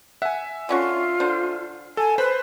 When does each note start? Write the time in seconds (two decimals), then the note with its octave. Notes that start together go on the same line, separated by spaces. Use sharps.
0.22 E5 F#5 G#5
0.69 D3 C#4 F4 F#4
1.20 D3 D4 C5
1.97 A4 G#5
2.18 B4 C5 B5